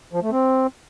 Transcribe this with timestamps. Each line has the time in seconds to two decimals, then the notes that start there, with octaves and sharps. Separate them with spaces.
0.13 F3
0.22 A3
0.31 C4